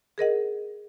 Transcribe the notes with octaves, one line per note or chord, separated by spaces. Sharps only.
G#4 A#4 D#5 F#5